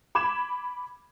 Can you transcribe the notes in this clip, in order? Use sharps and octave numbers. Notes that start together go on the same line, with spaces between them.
B5 D6 G#6 E7